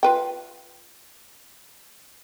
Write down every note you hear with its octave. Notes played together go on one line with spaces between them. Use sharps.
F4 B4 G5